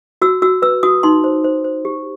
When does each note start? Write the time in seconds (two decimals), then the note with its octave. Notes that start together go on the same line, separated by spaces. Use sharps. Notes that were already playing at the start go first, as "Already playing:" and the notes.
0.22 F#4 E6
0.42 F#4 E6
0.62 B4 E6
0.83 F#4 D#6
1.03 D#4 C6
1.24 C5
1.44 C5
1.64 C5
1.85 G4